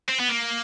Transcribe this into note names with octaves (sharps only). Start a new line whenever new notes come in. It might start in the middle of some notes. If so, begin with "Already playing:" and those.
C4
B3
A#3